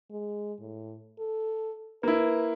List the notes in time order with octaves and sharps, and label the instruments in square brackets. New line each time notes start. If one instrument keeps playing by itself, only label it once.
[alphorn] G#3
A2
A4
[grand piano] A#3 E4 [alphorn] B4